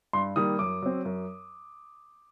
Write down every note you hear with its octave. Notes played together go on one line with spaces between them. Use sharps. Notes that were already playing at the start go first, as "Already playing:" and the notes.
G2 C6
D#3 G3 A#3 D#6
F#2 D6
F#3 C4
F#2